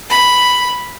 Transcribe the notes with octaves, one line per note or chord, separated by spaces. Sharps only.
B5